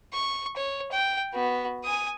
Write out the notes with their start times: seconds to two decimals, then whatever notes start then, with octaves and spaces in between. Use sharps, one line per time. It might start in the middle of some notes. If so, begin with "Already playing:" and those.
0.13 C#6
0.57 C#5
0.92 G5
1.33 B3 F#4
1.84 G#5 D#6